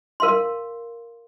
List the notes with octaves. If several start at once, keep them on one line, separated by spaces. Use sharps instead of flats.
A#4 F5 C6